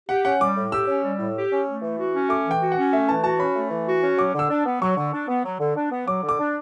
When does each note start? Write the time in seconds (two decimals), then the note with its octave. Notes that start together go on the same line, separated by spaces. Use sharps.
0.09 G4 F#5
0.25 C#4 F#5
0.41 G3 D6
0.57 A2
0.72 G4 E6
0.88 C#4
1.03 G3
1.19 A2
1.36 G4
1.51 C#4
1.66 A3
1.82 E3
1.98 F#4
2.14 C#4
2.29 A3 D6
2.45 E3
2.51 G5
2.61 F#4
2.72 F#5
2.77 C#4
2.93 A3 E5
3.08 E3 A5
3.24 F#4 A5
3.39 C#4 B5
3.56 A3
3.71 E3
3.87 F#4
4.02 C#4
4.18 F#3 D6
4.35 D3 E6
4.50 D4
4.66 B3
4.82 F#3 C#6
4.97 D3
5.13 D4
5.28 B3
5.45 F#3
5.60 D3
5.76 D4
5.92 B3
6.08 F#3 D6
6.23 D3
6.29 D6
6.40 D4